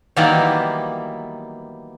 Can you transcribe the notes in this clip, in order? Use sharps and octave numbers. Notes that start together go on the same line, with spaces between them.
D#3 E3 F#3 G3 A#3 B3